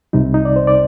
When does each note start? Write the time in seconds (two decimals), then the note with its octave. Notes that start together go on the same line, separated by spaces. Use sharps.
0.13 C2 C3 G3 D#4
0.34 D#4
0.45 D5
0.56 C5
0.67 D5